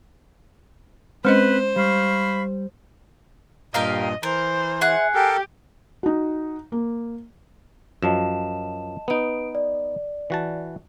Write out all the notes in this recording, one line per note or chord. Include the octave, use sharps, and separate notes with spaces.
G#3 C4 C#4 B4 C5 D#5
G3 F5 B5 C#6
G2 A#2 G4 A#4 D#5 F5
E3 A#4 C5
G#4 E5 F#5
G4 A4 A#4 G5
D#4 F#4
A#3
F#2 F3 F#3 D#5 A5 E7
B3 D#4 B4 D7
D5
E3 F#4 A5